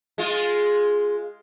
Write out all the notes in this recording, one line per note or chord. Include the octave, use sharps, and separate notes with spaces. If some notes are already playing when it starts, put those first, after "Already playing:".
G#3 F4